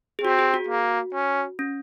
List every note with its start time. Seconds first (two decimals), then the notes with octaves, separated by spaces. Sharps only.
0.19 G#4
0.24 C4 F#4
0.39 G#4
0.54 F#4
0.69 A#3
1.14 C#4
1.59 C#4